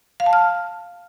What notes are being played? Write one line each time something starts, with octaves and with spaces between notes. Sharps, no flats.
F5
A5
F6